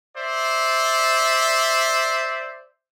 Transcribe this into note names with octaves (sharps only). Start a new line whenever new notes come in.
C5 D5 E5